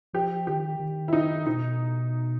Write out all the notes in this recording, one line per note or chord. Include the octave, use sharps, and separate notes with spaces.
F3 G4
D#3 G4
D#3
E4
D#4
B2 D#4